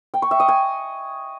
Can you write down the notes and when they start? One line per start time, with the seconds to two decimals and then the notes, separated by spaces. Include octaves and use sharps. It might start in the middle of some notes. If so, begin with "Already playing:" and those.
0.14 G5
0.22 C#6
0.31 E5
0.40 D#5
0.48 G#5